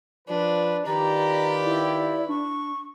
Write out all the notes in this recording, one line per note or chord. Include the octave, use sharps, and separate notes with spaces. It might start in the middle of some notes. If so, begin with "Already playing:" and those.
F3 D4 B4
D#3 F4 G4 B4 D5 A#5
E4
D4 C#6